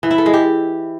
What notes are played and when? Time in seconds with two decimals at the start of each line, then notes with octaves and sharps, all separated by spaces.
0.03 E3
0.11 E4
0.18 A4
0.26 G#3
0.33 G4